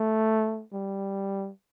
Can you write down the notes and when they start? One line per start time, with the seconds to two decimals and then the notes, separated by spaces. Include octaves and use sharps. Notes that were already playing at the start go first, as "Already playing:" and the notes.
Already playing: A3
0.73 G3